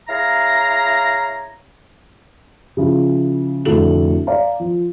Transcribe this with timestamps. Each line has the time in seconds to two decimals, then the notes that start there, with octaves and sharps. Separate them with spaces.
0.08 E4 G#4 C#5 F5 A#5
2.77 C#3 F3 E4
3.65 F1 A2 D3 F#4 A4 F#7
4.27 D5 F5 A#5
4.60 F3